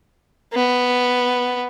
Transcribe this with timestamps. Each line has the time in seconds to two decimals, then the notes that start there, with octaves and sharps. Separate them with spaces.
0.53 B3